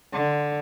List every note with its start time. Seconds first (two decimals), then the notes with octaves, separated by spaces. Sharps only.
0.13 D3